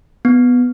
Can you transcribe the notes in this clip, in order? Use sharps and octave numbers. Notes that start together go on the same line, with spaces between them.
B3